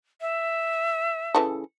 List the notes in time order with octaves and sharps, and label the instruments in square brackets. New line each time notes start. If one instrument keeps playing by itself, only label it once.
[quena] E5
[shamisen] C#3 E3 A4